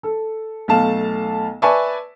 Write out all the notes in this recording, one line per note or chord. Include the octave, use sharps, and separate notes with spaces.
A4
B1 A3 F5 A5 E7
B4 D5 E5 G#5 A5 C#6